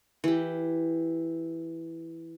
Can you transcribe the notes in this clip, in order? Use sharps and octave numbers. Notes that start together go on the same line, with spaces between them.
E3 G4